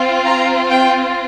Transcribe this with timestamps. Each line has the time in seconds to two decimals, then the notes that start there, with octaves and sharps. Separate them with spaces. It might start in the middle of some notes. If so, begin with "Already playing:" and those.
Already playing: C4 F4
0.26 A#5
0.71 G5